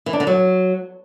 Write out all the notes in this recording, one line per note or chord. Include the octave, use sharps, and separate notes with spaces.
E3
D4
D3
F#3